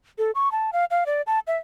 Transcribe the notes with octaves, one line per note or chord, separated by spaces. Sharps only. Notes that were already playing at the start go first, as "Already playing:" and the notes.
A4
C#6
A5
F5
F5
D5
A5
E5